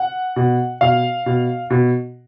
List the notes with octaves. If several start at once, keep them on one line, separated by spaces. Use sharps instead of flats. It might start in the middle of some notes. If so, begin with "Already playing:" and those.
Already playing: F#5
B2
B2 F5
B2
B2